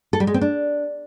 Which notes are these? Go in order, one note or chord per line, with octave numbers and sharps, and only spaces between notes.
A4
G3
G#3
C4
D4